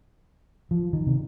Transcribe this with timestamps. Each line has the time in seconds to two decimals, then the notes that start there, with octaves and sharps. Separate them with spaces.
0.71 F3
0.93 D#3
1.07 C3